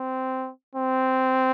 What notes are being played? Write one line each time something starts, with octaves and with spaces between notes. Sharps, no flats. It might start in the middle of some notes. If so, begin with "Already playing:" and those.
Already playing: C4
C4